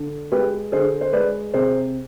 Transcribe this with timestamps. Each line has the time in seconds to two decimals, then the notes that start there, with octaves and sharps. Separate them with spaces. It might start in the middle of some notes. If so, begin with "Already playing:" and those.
Already playing: D3
0.32 G#3 G4 B4
0.72 D3 G#4 C5
1.01 C5
1.13 G#3 B4 D5
1.54 C3 G#4 C5